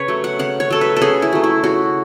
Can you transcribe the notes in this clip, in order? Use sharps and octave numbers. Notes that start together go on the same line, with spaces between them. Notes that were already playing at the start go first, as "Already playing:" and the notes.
Already playing: C#3 B4 C#5
F#3 A3
F#5
C#3 F#5
C#5
F#3 A3 A4
B4
A4
C#3 G#4
E4
F#3 A3
E4
C#3 F#4